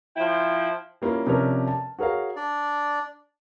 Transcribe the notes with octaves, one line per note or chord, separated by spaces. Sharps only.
F3 E4 G5
G3 A#3 C#4 E4 F4
C3 F3 C#4 D4 A#4
A5
F#4 G#4 A#4 C#5 F5
D4 D5